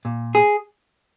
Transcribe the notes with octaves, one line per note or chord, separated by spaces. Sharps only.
A#2
G#4